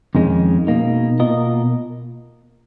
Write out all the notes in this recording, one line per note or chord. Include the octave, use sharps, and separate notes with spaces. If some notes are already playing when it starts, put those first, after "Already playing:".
F2 D#3 G#3 C#4
B2 A#3 D#4
B2 A#3 F4 A#4 D#5